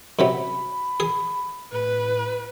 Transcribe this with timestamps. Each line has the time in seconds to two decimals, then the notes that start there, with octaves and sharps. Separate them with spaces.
0.19 F#2 C3 F#3 B5
1.00 G#4
1.72 A2 B4